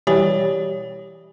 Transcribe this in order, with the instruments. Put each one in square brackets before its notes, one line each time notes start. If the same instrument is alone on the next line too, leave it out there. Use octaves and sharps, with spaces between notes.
[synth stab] B2 E3 G3 [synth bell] G4 C#5 D5